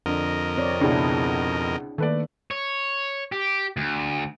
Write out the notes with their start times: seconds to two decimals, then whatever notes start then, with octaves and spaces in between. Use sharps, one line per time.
0.06 F2 D3 A#4 D#5
0.57 C4 C#5 D5
0.81 C#2 B2 D4 E4 G#4
1.98 D#3 A3 A#3 B4 D5
2.51 C#5
3.32 G4
3.77 D2